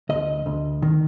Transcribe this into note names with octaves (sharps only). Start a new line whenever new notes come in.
D2 D#5
D2
D#3